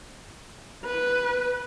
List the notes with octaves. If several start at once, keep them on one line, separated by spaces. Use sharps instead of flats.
B4